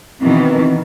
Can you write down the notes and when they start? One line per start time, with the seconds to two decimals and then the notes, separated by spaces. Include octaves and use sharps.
0.20 B2 D#3 E3 C4